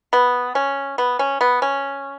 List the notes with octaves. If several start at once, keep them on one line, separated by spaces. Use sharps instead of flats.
B3
C#4
B3
C#4
B3
C#4